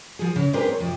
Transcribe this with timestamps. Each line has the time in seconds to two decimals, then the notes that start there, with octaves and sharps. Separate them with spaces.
0.19 F3 G#4
0.36 C#3
0.53 C4 D4 G4 G#4 A#4 B4
0.68 C#5
0.80 F2 C3